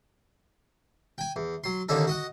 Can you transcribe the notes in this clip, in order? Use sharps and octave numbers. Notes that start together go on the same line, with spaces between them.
G5 G#5
E2
F#3 C6
D#2 A#2 D3 C#4 D#4 A4
F#4 D#5 F#5